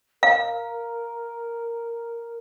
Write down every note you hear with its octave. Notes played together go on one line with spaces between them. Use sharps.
A#4 F5